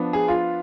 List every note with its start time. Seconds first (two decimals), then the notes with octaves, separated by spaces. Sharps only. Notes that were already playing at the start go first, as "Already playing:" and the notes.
Already playing: F3 B3 D4
0.13 G#4
0.28 F4